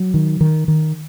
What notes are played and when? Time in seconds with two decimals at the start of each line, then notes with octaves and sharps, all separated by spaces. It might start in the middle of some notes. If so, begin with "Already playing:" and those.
Already playing: F#3
0.14 D#3
0.41 D#3
0.68 D#3